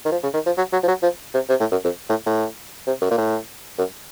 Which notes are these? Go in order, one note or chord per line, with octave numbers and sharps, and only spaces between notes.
D#3
F3
C#3
D#3
F3
F#3
F#3
F3
F#3
F3
C3
C3
A2
F#2
F2
A2
A2
C3
F#2
A#2
A2
F#2